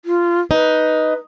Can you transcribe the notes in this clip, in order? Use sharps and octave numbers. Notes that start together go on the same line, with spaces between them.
F4
D#4 B4